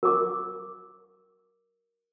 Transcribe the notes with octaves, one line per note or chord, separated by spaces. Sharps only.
A#4 D6